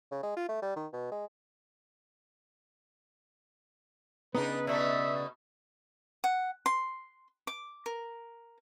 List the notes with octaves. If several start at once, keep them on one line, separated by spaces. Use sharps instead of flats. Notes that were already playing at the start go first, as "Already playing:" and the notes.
C#3
G#3
F4
A3
G3
D#3
B2
G#3
C#3 B3 D4 D#4 B4
B2 A3 D#4 D5 E5
F#5
C6
D6
A#4